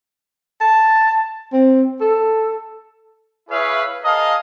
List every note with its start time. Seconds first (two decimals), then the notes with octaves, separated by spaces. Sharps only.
0.61 A5
1.53 C4
2.01 A4
3.50 E4 G#4 B4 C#5 E5 F5
4.03 G#4 A#4 D#5 F5 A5 D#6